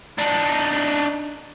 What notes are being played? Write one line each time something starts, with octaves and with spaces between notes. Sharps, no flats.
D4 D#4